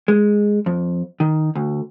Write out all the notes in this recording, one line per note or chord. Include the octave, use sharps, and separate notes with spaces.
G#3
F2
D#3
D2